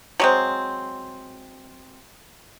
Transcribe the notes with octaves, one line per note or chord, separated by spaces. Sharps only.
F#3 G#3 C4